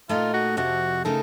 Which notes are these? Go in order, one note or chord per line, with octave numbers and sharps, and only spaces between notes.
A#2 A3 D#4 F4 A#4 D#5
F#4
F2 C3 F3 C4 F#4
C#3 A3 D#4 A4 A#4